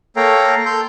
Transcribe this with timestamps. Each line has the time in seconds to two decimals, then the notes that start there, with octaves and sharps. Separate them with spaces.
0.16 A#3 A4 C#5 F5 G5 A#5
0.66 A4 C6 G6